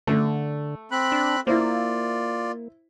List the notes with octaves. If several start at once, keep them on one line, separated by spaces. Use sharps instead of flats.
D3 A3
C4 B5 F#6
D4
A#3 E4 F4 C5 D5